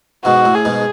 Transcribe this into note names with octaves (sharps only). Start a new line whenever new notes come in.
G#2 B2 F#4
A2
G#4
G#2 B2